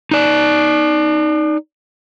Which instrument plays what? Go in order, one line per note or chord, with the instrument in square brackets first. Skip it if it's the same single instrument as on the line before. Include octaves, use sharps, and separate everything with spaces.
[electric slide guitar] D#4 D5